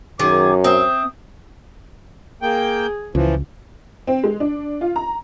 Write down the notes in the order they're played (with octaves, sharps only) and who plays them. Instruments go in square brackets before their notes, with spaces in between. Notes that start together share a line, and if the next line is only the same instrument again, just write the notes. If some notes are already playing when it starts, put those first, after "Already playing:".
[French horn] F#2 [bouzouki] D#3 G#4 [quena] D6
[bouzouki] C4 E5 [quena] D#6
[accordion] A#3 G5 [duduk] G#4
[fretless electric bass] C#2 [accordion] E3 F3
[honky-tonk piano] C4
G#3
D4
F4
A#5